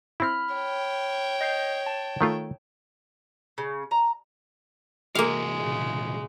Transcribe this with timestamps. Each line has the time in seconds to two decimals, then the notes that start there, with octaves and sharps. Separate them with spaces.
0.20 C4 E4 B5 F6
0.55 C#5 G5
1.41 D#5 G6 C7
1.86 A5
2.21 D#3 A3 F4
3.58 C#3
3.91 A#5
5.15 C3 E3 G#3 A#3 F#4 F5
5.57 A#2 C#3